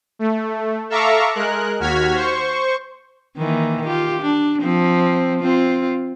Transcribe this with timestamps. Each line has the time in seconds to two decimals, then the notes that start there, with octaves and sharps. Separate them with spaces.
0.19 A3
0.89 A4 E5 F5 A#5 C#6 D6
1.35 G#3 A#4 F#6
1.80 D#2 F#4 F6 G#6 B6
2.15 C5 C#6
3.38 D#3 E3 A#3
3.86 F4 G4
4.21 D4
4.62 F3 C4
5.41 C4 F4